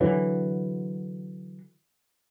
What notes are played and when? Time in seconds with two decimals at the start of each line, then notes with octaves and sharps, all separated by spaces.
0.01 D3 E3 F#3